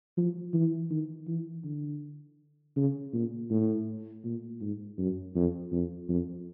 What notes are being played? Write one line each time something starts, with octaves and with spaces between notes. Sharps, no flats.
F3
E3
D#3
E3
D3
C#3
A#2
A2
A#2
G#2
F#2
F2
F2
F2